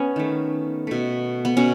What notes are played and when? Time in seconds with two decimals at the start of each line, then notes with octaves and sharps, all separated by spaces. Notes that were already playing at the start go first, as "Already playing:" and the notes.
Already playing: B3 C#4
0.16 D#3 A3
0.87 B2 A3
1.45 B3
1.57 B2 C#4